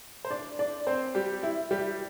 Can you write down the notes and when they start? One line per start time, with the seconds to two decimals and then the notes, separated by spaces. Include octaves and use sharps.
0.25 C5
0.31 D4 D5
0.59 D4 D5
0.87 C4 C5
1.15 G3 G4
1.43 E4
1.71 G3 G4